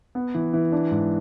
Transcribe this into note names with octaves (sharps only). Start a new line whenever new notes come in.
B3
E3
E3
D4
G#2